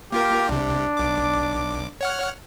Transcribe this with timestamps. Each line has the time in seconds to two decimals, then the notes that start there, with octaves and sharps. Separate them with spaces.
0.12 A#3 F4 G4 A#4
0.49 C2 C3 D4
0.97 B1 D6
2.01 C#5 F#5 F6